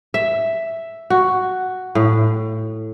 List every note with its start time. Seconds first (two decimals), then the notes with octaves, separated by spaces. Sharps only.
0.14 E5
1.10 F#4
1.95 A2